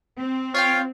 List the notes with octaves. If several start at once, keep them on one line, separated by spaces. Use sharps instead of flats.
C4
F4 C#5 F5 G5